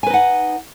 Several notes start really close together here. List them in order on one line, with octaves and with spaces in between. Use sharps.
G#5 B4 D#4 F#5